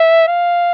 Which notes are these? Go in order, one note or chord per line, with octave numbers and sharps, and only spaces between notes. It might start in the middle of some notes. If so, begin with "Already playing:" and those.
Already playing: E5
F5